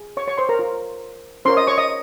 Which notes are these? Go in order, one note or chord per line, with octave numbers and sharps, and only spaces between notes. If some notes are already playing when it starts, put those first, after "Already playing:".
Already playing: F4 G#4
C#5 C#6
C#5 C#6
C5 C6
A#4 A#5
F4 C5
C#4 F4 A#4 C5 C#5 C6
D#5 D#6
C#5 C#6
D#5 D#6